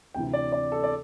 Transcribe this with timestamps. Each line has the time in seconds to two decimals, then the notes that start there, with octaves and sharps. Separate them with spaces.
0.14 D2 C3 E3 G5
0.33 D5
0.52 D5
0.72 A4
0.84 D5